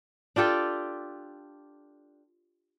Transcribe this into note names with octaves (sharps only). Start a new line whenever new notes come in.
D4 F4 G4 A4